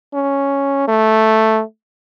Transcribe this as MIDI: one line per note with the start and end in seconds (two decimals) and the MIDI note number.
0.13 0.86 61
0.88 1.62 57